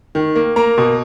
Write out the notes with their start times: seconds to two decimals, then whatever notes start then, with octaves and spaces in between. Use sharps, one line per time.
0.15 D#3
0.35 A#3
0.56 A#3 A#5
0.78 B2